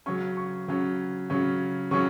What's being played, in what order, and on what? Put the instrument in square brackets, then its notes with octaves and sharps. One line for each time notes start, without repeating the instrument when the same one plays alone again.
[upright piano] C#3 F#3 C#4 C#6
C#6
C#3 F#3 C#4
C#3 F#3 C#4
C#3 F#3 C#4 C#6